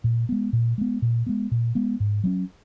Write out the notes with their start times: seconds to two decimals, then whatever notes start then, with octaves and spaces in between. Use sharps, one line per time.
0.04 A#2
0.29 G#3 B3
0.53 A#2
0.78 G#3 B3
1.02 A#2
1.26 G#3 B3
1.51 A#2
1.75 G#3 B3
2.00 G#2
2.24 F#3 A#3 C#4